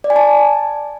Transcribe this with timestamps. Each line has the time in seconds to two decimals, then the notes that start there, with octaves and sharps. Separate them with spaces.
0.04 D5
0.10 G#5
0.16 A5